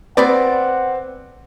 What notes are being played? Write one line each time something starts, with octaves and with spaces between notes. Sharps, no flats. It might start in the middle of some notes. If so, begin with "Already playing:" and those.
B3 C4 B4 D5 F#5